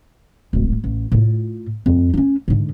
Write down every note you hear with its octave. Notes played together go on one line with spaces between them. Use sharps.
D1 G#1
A1
A2 F4
F2
C#4 D#4
G#2 D3